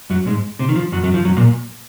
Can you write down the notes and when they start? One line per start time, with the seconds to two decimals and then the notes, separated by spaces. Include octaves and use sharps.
0.10 F#2 F#3
0.26 G#2 G#3
0.59 C3 C4
0.69 D#3
0.76 F3
0.92 F#2 F#3
1.03 F#2 F#3
1.14 F3
1.25 F#2 F#3
1.37 A#2 A#3